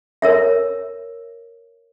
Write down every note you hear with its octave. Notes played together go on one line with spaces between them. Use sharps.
A#4 C#5 E5